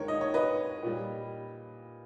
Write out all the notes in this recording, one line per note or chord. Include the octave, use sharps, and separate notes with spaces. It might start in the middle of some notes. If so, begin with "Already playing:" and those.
Already playing: D#2 D#3 G#3 A#4 C#5
D#5
C#5
B4 D#5
A#2 G3